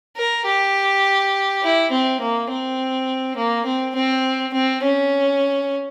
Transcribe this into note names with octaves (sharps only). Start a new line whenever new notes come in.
A#4
G4
E4
C4
A#3
C4
A#3
C4
C4
C4
C#4